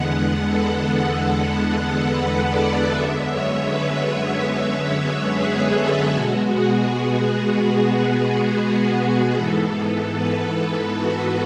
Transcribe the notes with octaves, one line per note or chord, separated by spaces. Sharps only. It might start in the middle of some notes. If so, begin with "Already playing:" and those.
Already playing: E2 D3 G#3 B3 F#5
A4
B4
D5
F#2 D3 G#3 B3 E5
C#5
B4
B4
G#4
A4
B2 G#3 B3 F#4
G#4
G#4
G#4
G#2 E3 B3 A4
B4
F#4